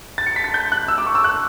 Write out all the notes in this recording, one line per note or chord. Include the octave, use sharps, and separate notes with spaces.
A6
C#7
B6
A6
G6
F#6
E6
D6
C#6
E6
F#6